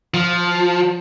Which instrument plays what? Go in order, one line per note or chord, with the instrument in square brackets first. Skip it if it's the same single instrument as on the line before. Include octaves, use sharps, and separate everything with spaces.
[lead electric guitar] F3